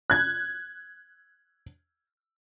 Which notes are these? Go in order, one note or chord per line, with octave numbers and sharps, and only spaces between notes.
F#6 G#6